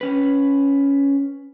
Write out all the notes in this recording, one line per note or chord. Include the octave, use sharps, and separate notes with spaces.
C#4 B4